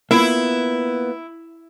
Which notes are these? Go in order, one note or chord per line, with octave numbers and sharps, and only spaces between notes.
A#3 B3 E4 F4